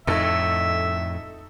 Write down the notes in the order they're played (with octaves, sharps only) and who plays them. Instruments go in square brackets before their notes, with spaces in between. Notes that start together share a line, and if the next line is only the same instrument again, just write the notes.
[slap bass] F2 A2 [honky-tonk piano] D#4 A4 [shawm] E5